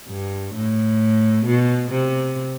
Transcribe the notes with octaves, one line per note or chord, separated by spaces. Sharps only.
G2
A2
B2
C3